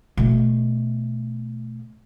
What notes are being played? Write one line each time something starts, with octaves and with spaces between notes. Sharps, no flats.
B2 A3